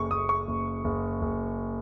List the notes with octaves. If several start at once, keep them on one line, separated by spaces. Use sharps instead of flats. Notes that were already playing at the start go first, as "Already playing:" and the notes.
Already playing: F#1 C#6
F#1 D#6
C#6
F#1
F#1
F#1